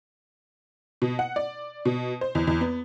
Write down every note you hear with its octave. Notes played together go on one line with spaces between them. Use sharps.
B2
F#5
D5
B2
C5
E2
E2
B3